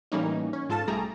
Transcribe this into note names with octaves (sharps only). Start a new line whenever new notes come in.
A2 E3 G3 A#3 C#4 D#4
C#4
G#2 F4 A4 A5
B1 G3 A3 G#4 A#5